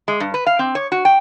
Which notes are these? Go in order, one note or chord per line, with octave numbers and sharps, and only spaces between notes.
G#3
G2
B4
F5
C4
C#5
F#4
G5